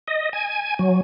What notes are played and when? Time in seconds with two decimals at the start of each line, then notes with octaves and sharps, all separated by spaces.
0.08 D#5
0.33 G#5
0.79 F#3